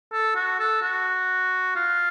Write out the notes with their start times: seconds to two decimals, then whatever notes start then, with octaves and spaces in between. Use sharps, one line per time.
0.12 A4
0.35 F#4
0.59 A4
0.82 F#4
1.76 F4